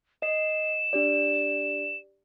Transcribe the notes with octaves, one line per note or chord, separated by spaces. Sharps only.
D#5 C7 E7
D4 G4 D5